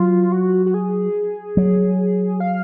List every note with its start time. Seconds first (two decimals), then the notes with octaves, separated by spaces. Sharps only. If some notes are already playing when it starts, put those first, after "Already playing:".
Already playing: F#3 F4
0.32 F#4
0.66 F#4
0.74 G#4
1.57 F#3
2.40 F5